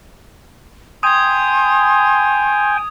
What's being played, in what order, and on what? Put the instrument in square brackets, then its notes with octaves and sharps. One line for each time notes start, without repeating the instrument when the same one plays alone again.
[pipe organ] G5 G#5 [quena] C6 [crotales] D#6 G#6